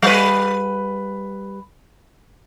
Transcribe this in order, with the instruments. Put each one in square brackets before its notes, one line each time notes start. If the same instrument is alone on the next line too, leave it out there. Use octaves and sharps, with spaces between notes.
[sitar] G3 B4